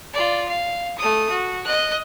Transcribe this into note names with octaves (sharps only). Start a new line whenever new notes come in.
F4 D5
F5
A3 D#6
F#4
D#5 F#6